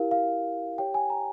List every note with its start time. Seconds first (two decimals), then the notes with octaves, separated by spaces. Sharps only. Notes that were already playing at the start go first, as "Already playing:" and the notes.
Already playing: E4 G4 A#4 F5
0.11 F5
0.78 G4 C#5 G5
0.94 G#5
1.10 A#5